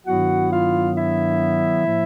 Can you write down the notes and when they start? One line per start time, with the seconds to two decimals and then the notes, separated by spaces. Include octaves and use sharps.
0.05 G2 D#3 F#3 B3 E4 F#4 F#5
0.50 F4 F5
0.96 E4 E5
1.86 A2 F3 A#3